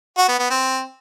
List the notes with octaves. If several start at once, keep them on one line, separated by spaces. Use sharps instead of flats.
F#4
B3
B3
C4